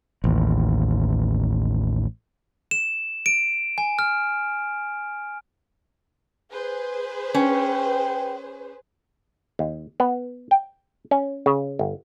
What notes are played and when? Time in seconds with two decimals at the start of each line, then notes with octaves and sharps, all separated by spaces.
0.24 A1 D#2
2.71 E7
3.26 D7
3.78 G#5
3.99 F6
6.51 G#4 B4 C5
7.35 C#4 G5
9.59 D#2
10.00 B3
10.51 G5
11.11 C#4
11.46 C#3
11.79 G1